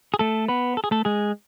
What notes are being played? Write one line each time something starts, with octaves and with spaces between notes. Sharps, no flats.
G#4
A3 A4
B3 B4
A4
G#4
A3 A4
G#3 G#4